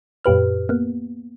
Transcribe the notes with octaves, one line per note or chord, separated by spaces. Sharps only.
F#2 A#2 G4 B4 F6
A#3 B3